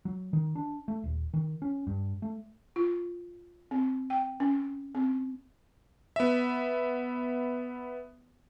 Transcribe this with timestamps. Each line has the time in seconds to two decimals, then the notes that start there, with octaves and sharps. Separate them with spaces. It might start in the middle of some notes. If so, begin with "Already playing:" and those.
0.05 F#3
0.33 D#3
0.55 D4
0.88 A3
1.04 D#1
1.34 D#3
1.62 C#4
1.87 G2
2.22 A3
2.76 F4
3.71 C4
4.10 G5
4.40 C#4
4.95 C4
6.16 B3 E5